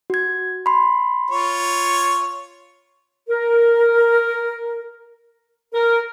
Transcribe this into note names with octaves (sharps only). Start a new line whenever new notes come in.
F#4 G#6
B5 C6
F4 C#5
A#4
A#4